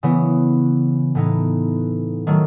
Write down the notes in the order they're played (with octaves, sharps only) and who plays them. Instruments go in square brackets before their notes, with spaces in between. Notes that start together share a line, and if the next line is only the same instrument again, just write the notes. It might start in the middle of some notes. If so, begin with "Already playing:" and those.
[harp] C#3 E3 B3
A2 E3 B3 D#4
D#3 F#3 A3